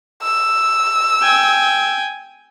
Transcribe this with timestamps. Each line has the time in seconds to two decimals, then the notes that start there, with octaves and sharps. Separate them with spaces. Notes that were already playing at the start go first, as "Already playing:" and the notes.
0.22 E6
1.22 G5 G#5